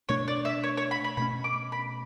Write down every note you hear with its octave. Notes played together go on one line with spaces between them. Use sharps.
B2 A3 D4 C#5
D5
E5
C#5
C#5
B5
B5
B2 A3 C#4 B5
D6
B5